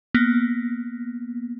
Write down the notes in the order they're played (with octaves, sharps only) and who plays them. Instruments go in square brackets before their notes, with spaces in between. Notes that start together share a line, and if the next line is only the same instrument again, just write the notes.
[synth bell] A#3 B3